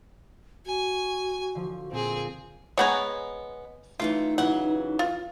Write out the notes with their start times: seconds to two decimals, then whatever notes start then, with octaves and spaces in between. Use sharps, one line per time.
0.66 F#4 G#5
1.55 D3 F3
1.92 A#2 C4 G#4
2.78 G#3 B3 C#5 F#5 G#5 A#5
4.00 F#2 E3 A3 D#4 F4
4.38 C#3 E3 F#3 F#5
4.99 F4